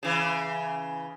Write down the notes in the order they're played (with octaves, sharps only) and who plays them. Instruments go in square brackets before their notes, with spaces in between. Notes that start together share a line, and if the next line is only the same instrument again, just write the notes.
[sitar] C#3 E3